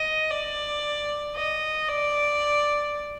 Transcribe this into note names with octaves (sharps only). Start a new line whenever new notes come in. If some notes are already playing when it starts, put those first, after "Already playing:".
Already playing: D#5
D5
D#5
D5